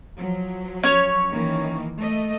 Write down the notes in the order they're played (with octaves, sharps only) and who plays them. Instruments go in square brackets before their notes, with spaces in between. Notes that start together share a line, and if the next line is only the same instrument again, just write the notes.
[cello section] F3 F#3
[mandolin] C#4 C#5
[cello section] D#3 E3 A#3
A3 D#5